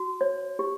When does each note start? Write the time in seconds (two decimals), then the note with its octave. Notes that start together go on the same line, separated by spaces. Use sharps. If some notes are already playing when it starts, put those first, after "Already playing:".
Already playing: F#4
0.21 C#5
0.59 G4